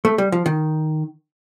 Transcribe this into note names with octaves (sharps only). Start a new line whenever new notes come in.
A3
G3
F3
D#3